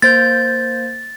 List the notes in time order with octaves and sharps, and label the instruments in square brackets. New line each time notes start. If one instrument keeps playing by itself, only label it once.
[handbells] A#3 C5 G6 [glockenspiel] A6